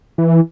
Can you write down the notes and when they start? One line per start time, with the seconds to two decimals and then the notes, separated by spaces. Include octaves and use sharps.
0.18 E3